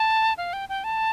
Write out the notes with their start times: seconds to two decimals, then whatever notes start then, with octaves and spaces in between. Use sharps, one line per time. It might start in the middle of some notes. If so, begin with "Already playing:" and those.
Already playing: A5
0.37 F5
0.53 G5
0.69 G5
0.84 A5